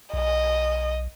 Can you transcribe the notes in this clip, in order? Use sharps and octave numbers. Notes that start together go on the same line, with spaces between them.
B1 D#5